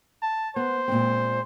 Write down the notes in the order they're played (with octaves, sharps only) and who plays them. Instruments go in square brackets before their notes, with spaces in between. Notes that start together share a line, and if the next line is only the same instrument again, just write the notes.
[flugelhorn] A5
[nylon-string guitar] B3 [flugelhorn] C5
[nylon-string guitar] A#2 G#3 C4